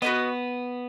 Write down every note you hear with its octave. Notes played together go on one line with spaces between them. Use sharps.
B3 F#4 B4 D#5